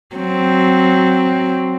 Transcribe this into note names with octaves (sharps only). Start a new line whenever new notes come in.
F#3 C4